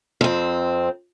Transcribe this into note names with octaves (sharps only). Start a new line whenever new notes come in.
F2 C4